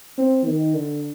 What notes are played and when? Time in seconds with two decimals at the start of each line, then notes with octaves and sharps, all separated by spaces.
0.18 C4
0.46 D#3
0.74 D3